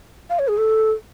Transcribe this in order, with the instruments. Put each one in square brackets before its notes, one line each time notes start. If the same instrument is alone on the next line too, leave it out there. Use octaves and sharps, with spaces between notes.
[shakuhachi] F5
C#5
G#4
A4